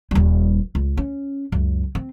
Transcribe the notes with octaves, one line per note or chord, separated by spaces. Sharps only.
D#1 G3
C#2
C#4
C#2 F#2
C4